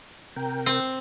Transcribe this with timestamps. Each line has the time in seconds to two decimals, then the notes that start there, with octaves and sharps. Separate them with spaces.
0.36 C3 A#4 G5
0.66 C4